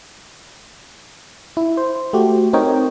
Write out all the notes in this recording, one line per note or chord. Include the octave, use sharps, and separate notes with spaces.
E4
C5
A3 F#4 G4
C4 D#4 A#4 C#5 D#5 G5